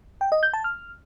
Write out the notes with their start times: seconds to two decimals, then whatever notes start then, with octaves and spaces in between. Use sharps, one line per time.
0.21 G5
0.32 D#5
0.43 G6
0.54 A5
0.64 F6